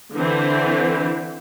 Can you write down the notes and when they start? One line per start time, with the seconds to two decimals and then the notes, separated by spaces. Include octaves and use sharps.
0.13 D3 E3 C4